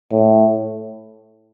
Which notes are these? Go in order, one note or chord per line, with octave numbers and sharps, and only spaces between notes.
A2